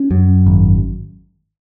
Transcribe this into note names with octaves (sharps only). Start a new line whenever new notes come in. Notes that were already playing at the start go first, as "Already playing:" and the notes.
Already playing: C#4
F#2
G#1